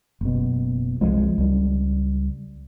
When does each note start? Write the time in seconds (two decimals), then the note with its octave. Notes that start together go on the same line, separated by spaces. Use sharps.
0.21 F#1 B2
1.01 C2 F3 G#3
1.38 C#2 G3